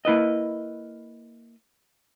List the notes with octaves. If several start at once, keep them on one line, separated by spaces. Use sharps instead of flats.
A#3 E4 B4 D#5